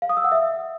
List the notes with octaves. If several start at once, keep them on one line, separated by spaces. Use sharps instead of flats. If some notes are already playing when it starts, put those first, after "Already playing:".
F5
D#6
E6
F#5
E5